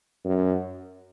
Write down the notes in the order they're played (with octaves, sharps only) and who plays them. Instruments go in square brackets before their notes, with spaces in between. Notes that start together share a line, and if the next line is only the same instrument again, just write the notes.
[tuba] F#2